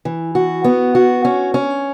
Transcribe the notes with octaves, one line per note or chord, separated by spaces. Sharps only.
E3
F#4
B3
F#4
C#4
C#4